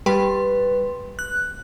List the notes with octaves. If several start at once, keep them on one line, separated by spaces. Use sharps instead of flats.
G3 B4 C6
F#6